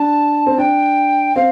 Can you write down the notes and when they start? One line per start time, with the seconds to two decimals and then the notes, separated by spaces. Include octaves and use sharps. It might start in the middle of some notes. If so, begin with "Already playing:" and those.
Already playing: D4 A5
0.46 C4
0.58 D4 G5
1.36 C4 F5